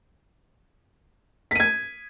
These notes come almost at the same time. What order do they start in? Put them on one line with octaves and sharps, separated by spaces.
B6 D#7 G#6